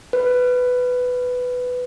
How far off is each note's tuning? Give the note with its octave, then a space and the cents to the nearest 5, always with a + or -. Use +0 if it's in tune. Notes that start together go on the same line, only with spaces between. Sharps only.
B4 +10